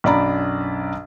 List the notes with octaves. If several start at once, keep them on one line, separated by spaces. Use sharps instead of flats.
B1 F#2 D4 D5 A#5 B5